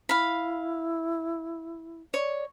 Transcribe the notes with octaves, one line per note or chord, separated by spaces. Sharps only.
E4 F5 B5
C#5 D5